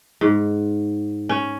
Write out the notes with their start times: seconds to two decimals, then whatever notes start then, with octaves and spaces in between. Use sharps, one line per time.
0.21 G#2
1.29 C#4